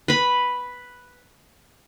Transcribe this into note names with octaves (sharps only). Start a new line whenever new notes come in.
B4 B5